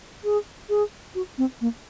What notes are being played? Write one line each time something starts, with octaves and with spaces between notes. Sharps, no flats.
G#4
G#4
F#4
C4
A#3